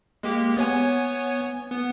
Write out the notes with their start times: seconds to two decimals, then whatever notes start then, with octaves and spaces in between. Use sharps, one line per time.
0.23 G#3 A#3 G4
0.57 B3 C#5 G#5
1.71 B3